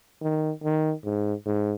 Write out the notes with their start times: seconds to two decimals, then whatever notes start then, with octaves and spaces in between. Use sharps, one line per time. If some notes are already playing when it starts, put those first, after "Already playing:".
0.22 D#3
0.64 D#3
1.05 G#2
1.45 G#2